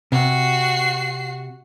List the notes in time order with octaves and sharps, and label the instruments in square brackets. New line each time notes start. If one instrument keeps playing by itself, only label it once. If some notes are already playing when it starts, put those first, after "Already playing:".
[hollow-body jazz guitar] C3 [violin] F#4 C7